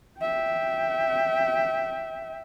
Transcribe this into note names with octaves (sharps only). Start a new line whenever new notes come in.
E5 G5